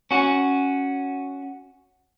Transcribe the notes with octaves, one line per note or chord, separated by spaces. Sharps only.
C#4 F#4